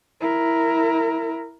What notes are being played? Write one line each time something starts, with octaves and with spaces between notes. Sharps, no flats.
E4 A#4